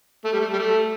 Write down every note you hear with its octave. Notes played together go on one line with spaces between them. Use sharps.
A3
G3
A3
G3
A3